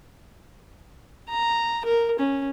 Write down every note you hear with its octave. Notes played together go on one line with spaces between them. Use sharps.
A#5
A#4
C#4